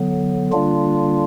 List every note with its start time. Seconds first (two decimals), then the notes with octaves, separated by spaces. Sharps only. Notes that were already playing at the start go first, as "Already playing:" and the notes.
Already playing: D3 F#3 B3
0.52 D3 G3 A#3 D4 F4